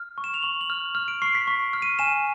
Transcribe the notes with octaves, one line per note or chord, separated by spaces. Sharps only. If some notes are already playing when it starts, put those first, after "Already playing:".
Already playing: F6
C#6
E7
F7
C#6 F#7
F#7
F6
F6
D7
C#6 C7
B6
C#6
F6
D#7
G#5 E7